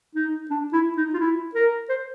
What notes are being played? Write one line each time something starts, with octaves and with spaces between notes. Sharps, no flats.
D#4
D4
E4
D#4
F4
E4
A#4
C5